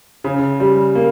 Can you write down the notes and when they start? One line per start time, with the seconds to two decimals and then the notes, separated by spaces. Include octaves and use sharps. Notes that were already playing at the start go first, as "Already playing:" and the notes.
0.24 C#3
0.60 G3
0.95 A#3